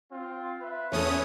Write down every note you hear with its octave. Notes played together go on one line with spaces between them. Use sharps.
C4 F4
B4 E5
E2 A3 C#4 A4 C#5 D#6